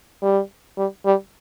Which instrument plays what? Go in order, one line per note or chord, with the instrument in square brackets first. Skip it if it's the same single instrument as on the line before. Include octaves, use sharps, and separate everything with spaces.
[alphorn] G3
G3
G3